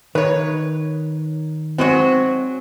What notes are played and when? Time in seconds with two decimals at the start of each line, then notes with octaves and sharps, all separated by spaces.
0.15 D#3 B4 C#5
1.78 F#3 G#3 C4 F#4